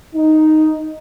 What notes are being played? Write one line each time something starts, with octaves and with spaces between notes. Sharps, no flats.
D#4